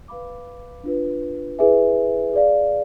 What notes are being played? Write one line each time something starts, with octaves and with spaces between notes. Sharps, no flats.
B4 F5 B5 D6
D4 F4 B4
E4 G#4 B4 E5 G#5
G#4 D5 F5